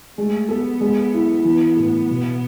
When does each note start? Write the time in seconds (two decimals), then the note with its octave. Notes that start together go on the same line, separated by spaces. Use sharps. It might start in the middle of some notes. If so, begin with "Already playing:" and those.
0.17 G#3 A3
0.49 B3 A4
0.81 G#3
1.14 E4
1.44 E3 B3
1.76 A2
2.09 B2